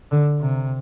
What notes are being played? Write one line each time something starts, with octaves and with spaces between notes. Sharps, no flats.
D3
C3